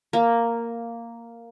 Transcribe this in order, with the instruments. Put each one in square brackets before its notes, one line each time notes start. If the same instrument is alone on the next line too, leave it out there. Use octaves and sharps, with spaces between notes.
[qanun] A#3